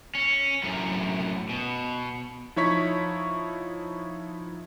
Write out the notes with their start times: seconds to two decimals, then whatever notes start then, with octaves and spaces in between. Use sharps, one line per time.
0.15 C#4
0.63 F#2 A2
1.49 B2
2.56 F3 D#4 E4 C#5 C#6 B6